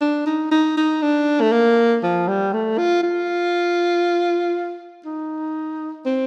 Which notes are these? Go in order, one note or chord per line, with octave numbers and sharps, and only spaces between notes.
D4
D#4
D#4
D#4
D4
A3
A#3
F3
G3
A3
F4
F4
D#4
C4